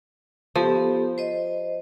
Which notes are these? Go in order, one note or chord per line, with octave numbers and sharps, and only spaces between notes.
F3 B3 G4 A4
C5 D#5